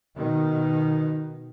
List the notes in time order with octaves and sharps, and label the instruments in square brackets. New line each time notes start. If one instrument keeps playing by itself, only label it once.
[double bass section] B2 D#3 [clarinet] D#4